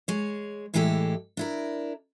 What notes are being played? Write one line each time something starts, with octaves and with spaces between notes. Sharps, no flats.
G#3 C#5
A2 E3 G#3 E4 G4 A4
D4 E4 A#4